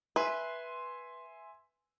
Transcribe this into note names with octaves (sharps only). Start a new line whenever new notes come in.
B4 E5 G#5 C6